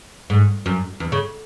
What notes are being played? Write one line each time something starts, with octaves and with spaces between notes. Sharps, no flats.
G#2
F#2
E2
C#3